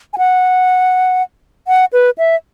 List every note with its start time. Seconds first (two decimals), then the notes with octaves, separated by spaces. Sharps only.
0.13 G#5
0.18 F#5
1.68 F#5
1.93 B4
2.18 E5